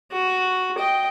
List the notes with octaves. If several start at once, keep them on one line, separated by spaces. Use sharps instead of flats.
F#4
D#5 G5